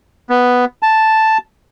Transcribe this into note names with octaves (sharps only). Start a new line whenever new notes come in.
B3
A5